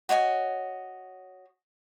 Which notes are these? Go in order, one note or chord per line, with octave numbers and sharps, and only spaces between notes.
F#4 C#5 D#5 G#5